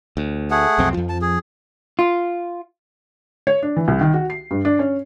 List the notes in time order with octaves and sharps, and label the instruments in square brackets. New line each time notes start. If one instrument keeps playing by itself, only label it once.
[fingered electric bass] D2
[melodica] A3 G#4 F#5
[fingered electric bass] B1 F2 C4
F2 F3
[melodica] A5
G#4
[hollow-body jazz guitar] F4
[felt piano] C#5
D4
E3
C2
D#3
F#4
C7
G2
D4
C#4